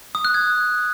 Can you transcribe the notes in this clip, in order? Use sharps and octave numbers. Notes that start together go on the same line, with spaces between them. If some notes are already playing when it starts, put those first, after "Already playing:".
D#6
F#6
G#6